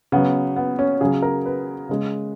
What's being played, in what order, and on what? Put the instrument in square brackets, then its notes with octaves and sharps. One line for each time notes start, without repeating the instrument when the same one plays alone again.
[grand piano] C#3 F#3 B3
B3
C#4
C#3 F#3 G#4
A#4
B4
C#3 G#3